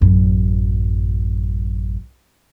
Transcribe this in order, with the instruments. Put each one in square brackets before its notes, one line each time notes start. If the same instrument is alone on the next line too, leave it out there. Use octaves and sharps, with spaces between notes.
[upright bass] A1 F#2